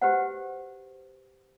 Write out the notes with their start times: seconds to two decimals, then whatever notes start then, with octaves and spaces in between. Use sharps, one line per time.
0.02 F#4 G4 B4 C5 F#5